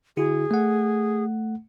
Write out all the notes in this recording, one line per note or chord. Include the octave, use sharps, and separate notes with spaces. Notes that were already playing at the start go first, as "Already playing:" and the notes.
D3 E4 F#4 G#4
A3 F#5